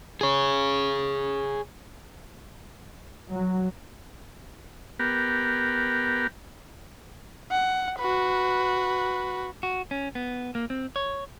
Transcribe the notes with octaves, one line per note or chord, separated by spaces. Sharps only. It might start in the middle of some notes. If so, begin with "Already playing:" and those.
G#4 C#5
F#3
B3 G4 A#4
F#5
F#4 B4
F#4
C#4
B3
A#3
C4
C#5